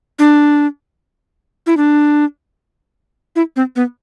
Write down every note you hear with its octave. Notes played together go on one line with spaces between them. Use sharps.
D4
E4
D4
E4
C4
B3